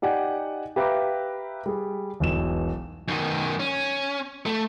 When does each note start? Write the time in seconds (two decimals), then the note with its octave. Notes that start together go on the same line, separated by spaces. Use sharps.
0.02 D#4 G4 D5 F#5 G#5
0.76 G4 B4 E5 F5 A#5 D6
1.66 G3 G#4
2.20 E1 B1 E7
3.08 F#2 D#3
3.60 C#4
4.46 A3